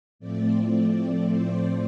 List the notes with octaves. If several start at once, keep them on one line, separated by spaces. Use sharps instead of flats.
A2 F3 A3 C4 D5
C5